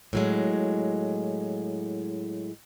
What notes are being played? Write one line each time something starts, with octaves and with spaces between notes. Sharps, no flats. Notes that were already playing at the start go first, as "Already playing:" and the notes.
A2 F#3 G#3